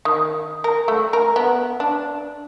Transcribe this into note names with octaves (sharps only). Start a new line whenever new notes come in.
D#3
A#4
A3
A#4
B3
D4